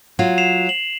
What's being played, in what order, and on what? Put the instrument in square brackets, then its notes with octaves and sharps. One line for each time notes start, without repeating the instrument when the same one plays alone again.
[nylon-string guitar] F#3 F4
[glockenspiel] C7 E7 F7
F#7